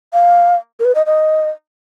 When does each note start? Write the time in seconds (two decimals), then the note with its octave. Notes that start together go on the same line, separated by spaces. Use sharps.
0.13 F5
0.80 A#4
0.85 B4
0.95 D#5
1.06 D#5